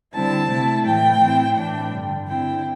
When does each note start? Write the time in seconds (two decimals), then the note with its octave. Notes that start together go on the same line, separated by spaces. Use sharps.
0.13 D3 G3 C4 E4 A5
0.49 C3 A3 E4
0.85 A2 E3 A3 G5
1.21 A2 E3 C4 E4
1.56 A2 E3 A3 D4 G5
1.92 G2 D3 G3
2.28 D3 C4 E4 G5